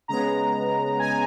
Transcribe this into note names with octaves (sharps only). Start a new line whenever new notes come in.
C#3 G#3 B3 A#5
G#5